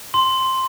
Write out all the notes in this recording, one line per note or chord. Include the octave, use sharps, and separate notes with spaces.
C6